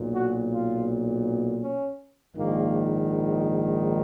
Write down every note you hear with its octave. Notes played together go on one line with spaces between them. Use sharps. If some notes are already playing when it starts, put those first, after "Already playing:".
Already playing: B1 A#2
F#4
F4
C#4
A#1 G#2 D#3 A#3